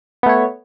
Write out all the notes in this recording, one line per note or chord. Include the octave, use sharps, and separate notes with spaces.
A3 B3 C#5